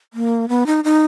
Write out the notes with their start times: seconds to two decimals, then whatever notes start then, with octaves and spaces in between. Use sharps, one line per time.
0.14 A#3
0.49 B3
0.66 D#4
0.84 D#4